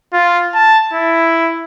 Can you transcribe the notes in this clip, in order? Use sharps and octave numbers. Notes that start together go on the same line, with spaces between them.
F4
A5
E4